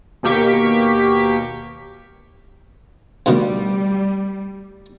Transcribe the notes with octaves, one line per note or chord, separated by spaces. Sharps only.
D#2 B2 A#3 G4 C#6 B6
G2 B2 D#3 G3 A3